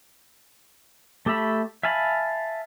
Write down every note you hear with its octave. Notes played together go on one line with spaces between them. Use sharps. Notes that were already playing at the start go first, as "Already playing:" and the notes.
A3 G4 A4 E5 B5
E5 F5 G#5 A5 B5